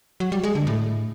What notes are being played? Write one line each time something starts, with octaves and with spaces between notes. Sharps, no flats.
F#3
G3
G#3
D3
A2